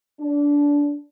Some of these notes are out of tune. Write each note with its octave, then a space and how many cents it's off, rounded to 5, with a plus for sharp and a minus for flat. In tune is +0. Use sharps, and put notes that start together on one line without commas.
D4 -20